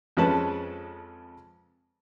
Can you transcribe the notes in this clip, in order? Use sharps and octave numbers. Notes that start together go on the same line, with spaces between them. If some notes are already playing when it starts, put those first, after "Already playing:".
F2 F3 G#3 C#4 B4 A5